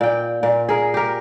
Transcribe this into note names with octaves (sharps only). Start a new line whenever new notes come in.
A#2 G5
A#2
G#4 A#4
G4 A#4